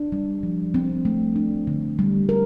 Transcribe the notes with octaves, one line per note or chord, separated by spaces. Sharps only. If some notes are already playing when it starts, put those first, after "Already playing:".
Already playing: D4
G3
F3
C4
A3
D4
D3
G3
A#4